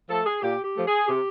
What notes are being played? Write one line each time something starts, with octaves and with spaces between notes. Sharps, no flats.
F3 A3 A4
G#4
A#2 G4
G4
F3 A3
G#4
C3 G4